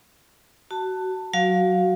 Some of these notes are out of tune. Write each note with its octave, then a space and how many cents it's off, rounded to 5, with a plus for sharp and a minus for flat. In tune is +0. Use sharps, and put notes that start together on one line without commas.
F#4 +20 A5 +15
F#3 +0 F#4 +0 F5 +0